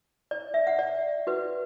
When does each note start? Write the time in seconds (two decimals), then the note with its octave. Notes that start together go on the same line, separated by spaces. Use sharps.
0.31 D5
0.54 E5
0.67 F#5
0.79 D5
1.27 F#4 B4